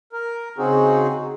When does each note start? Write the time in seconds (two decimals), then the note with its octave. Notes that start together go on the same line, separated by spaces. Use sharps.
0.13 A#4
0.58 C#3 C4 D#4 F#4 G#4